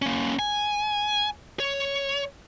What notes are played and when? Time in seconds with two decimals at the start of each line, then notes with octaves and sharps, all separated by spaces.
0.02 A#3 C#4
0.39 G#5
1.60 C#5